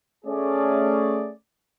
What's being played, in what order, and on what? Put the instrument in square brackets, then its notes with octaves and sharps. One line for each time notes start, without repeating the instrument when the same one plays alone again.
[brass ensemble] A3 C#4 G#4 D5